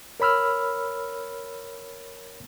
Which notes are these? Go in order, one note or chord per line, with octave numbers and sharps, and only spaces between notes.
A#4 C#5 B5 E6 F6